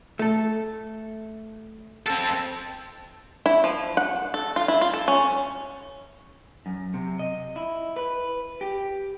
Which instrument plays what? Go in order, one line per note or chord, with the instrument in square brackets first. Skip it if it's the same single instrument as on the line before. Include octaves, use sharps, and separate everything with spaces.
[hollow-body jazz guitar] A3 A4
[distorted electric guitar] C4 A4
[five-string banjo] E4
F3
F#5
A4
F4
E4
F4
A4
C#4
[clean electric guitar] F#2
C3
D#5
E4
B4
G4